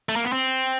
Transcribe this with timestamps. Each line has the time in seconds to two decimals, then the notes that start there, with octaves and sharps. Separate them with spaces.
0.09 A3
0.16 A#3
0.24 B3
0.32 C4